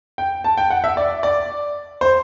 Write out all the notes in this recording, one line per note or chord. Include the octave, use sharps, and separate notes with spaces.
G5
A5
G5
F#5
E5
D5
D5
C5